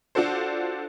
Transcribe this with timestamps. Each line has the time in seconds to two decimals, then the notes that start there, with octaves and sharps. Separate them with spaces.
0.15 D4 F4 F#4 A4 C5